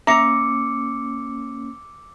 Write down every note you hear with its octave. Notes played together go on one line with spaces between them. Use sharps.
A#3 C#4 E5 A#5 D6 E6 C#7